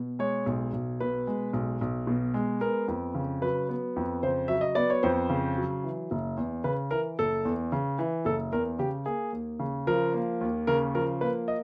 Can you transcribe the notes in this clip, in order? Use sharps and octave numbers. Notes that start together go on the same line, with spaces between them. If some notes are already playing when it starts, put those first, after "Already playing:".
Already playing: B2
G#3 C#5
B1
B1
B2 B4
G#3
B1
B1
B2
G#3
B3 A#4
F2
C#3
F#3 B4
B3
F2
C#3 C5
F#3 E5
D#5
B3 D5
C#5
F2 C5
C#3
F#3
E3
F#1
E2
C#3 B4
E3 A#4
F#1 A4
E2
C#3
E3
F#1 A4
E2 A#4
C#3 G4
A#3 G#4
D#2
C#3
F3 A#4
A#3
D#2
C#3 A#4
F3 A#4
A#3 B4
D#5